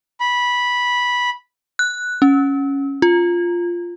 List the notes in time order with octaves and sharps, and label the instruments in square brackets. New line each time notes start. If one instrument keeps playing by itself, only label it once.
[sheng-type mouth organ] B5
[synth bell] F#6
C#4
F4